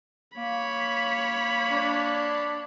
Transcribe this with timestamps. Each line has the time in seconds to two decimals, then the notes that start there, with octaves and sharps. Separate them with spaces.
0.37 A#3 C#5 B5
1.71 D4